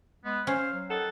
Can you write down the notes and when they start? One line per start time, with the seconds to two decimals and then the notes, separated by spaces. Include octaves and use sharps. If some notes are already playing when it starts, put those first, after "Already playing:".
0.25 G#3 B3
0.47 C#4 C5 F5
0.73 F#3
0.89 D#3 D#4 A4 F#5